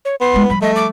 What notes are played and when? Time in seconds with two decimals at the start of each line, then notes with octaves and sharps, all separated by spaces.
0.05 C#5
0.21 B3 C6
0.34 G#3 E4
0.50 F3 G3 B5
0.62 A3 D#5
0.76 D6